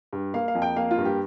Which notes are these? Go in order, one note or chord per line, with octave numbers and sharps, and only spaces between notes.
G2
A#3 F5
F5
F2
G5
A#3 F5
F4
G2
G4